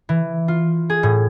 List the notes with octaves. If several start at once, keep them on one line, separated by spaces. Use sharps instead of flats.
E3
F4
G#4
A2